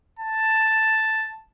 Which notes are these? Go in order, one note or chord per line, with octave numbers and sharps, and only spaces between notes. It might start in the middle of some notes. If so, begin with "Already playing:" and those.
A5